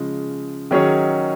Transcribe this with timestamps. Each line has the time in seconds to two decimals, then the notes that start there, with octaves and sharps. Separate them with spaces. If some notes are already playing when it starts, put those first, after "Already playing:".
Already playing: C#3 F3 G#3
0.71 D#3 F#3 C#4 G#4 C#5